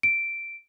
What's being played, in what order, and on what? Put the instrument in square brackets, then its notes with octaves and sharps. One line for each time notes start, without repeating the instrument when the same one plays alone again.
[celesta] D7